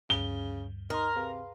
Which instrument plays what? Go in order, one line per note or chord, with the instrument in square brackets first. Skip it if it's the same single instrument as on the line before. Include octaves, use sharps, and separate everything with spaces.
[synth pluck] D2 G2 [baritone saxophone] C#3 [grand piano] G7
[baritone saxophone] D#4 [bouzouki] A#4 [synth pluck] A#5 C6
[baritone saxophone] C3 [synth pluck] G#4 B4 F5